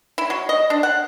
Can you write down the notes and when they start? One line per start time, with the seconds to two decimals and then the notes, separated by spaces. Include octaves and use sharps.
0.18 E4
0.30 F#3
0.49 D#5
0.70 D4
0.83 F#5